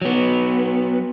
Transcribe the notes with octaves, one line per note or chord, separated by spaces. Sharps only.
F#3 B3